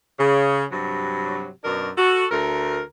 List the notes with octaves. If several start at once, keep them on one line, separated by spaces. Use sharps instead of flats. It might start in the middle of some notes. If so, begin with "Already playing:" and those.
C#3
G2 C3 F#3
F#2 B2 D4 A#4
F#4 A4
D2 A3 A#4